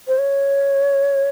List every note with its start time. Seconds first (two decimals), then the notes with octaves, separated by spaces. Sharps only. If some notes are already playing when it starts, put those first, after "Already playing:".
0.07 C5
0.18 C#5